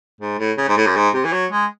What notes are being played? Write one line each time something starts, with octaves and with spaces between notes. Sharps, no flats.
G#2
A2
C#3
G#2
A2
F#2
G#2
C3
E3
F#3
G#3